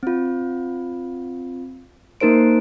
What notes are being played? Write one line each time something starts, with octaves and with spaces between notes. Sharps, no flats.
C4 F4
A#3 D#4 A#4 C5 D7